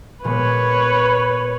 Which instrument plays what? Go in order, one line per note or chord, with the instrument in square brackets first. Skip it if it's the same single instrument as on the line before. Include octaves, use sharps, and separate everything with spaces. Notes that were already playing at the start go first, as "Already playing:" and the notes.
[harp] A#2 G#3 B3 [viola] B4 C#5